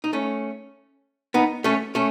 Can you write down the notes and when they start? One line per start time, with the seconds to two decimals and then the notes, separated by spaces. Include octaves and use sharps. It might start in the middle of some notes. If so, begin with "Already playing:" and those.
0.04 D#4
0.13 A3 C#4
1.34 B3 D#4
1.64 A3 C#4
1.95 A3 C#4